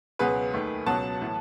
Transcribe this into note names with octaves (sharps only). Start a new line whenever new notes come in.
C#2 B2 F#3 B3 G#4 B4
D#2 D#3 A3
C#2 B2 F#3 B3 F#5 A5
A2 E3 B3